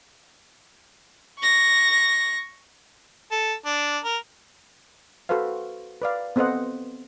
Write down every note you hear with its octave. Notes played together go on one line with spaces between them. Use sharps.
C#6 A#6
A4
D4
A#4
F#4 A4 B4 C5 F5
B4 D5 F5
B3 C4 A4 C5 D#5 F#5